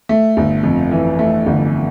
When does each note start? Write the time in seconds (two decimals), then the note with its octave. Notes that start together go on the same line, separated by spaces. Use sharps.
0.09 A3
0.37 G1
0.63 F2
0.91 E3
1.19 A3
1.46 G1